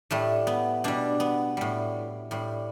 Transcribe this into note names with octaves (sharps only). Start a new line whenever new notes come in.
A2 G3 A3
B3
B2 G3 D4
B3
A2 G3
A2 G3